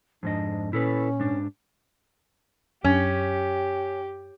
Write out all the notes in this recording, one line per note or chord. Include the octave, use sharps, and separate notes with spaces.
F2 G#2 D4 D#5
A#2 C#4 E4 A4 B4
G#2 D4
F#2 C#4 G4